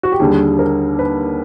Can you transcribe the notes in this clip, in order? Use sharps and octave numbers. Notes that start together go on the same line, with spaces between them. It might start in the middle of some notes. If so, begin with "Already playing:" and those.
F#4
G4
D#2 D3 G3 G#4
A#4
B4